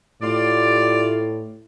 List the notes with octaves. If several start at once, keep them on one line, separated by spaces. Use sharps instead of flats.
A2 F4 G4 D5